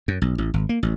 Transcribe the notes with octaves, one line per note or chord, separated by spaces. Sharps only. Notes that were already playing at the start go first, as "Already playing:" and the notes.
F#2
B1
A1
G#1
A#3
A1